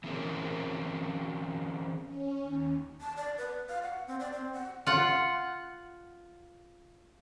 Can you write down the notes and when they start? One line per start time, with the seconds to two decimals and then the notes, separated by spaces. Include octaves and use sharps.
0.04 E3 F#3 C4 C#4 G#4 A#4
2.04 C#4
2.40 D#2
3.01 A5
3.17 D5
3.38 B4
3.69 F5
3.83 F#5
4.07 C4
4.20 D5
4.33 C4
4.53 F#5
4.86 F4 F#5